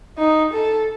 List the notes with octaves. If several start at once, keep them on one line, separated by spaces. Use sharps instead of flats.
D#4
A4